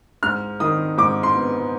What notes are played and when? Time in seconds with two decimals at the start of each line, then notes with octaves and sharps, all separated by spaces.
0.23 G#2 F6
0.60 D#3 D#6
0.98 G#2 D6
1.23 C6
1.35 B3